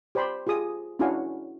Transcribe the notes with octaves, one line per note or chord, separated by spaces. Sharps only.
G4 C5 D5 B5 C6
F4 G4 G#4 D#6
C#4 D4 E4 F#4 F5 G#5